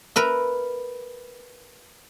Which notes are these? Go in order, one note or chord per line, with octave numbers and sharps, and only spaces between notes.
A#4 B4 E5